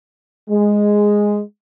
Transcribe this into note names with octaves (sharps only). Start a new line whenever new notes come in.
G#3